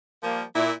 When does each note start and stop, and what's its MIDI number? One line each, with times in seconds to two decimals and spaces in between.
0.23 0.43 53
0.23 0.43 55
0.23 0.43 58
0.55 0.71 46
0.55 0.71 64